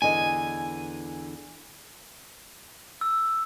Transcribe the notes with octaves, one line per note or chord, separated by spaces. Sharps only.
E2 D3 D#5 G#5
E6